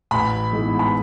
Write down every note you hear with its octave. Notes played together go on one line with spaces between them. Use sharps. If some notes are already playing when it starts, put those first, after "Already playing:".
A1 B5
G#2 E3 G#3 B3
B5